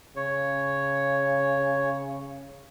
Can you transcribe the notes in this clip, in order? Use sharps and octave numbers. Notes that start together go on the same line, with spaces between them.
C#3 C#5